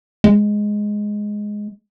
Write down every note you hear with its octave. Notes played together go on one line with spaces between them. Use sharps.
G#3